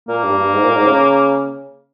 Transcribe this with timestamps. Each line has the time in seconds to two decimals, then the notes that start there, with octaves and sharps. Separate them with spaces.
0.08 A#2 A#3
0.24 G2
0.38 G2
0.53 G#2
0.64 A#2
0.76 G#2
0.87 C#3